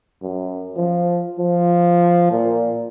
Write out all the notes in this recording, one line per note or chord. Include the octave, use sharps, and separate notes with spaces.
F#2
F3
F3
A#2